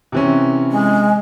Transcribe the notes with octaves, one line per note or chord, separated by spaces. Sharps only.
C3 E3 C#4
G#3